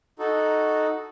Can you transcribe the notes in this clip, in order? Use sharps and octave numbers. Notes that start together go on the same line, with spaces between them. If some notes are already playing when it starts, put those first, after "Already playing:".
D#4 F#4 A4